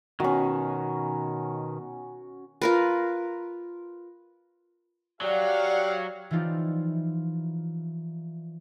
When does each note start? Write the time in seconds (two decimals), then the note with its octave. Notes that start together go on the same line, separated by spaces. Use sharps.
0.20 B2 D#3 C#4 F#4
2.62 F4 A#4 B4
5.21 F#3 G4 D5 F5 F#5
6.31 E3 F3 D#4 F4 G4 D5